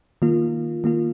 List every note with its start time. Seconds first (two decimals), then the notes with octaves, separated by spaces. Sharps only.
0.22 D#3 A#3 F4
0.84 D#3 A#3 F4